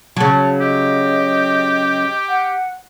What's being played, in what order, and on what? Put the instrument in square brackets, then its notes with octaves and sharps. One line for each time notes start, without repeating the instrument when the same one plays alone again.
[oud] C#3 F#3 [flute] A5
[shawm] G4 [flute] D#5
[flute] F#5